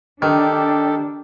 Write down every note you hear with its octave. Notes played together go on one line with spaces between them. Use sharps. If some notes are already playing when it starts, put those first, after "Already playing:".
D#3 D4 G4 A4